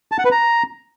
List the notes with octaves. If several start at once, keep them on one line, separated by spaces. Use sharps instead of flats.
A5
F#5
B4
A#5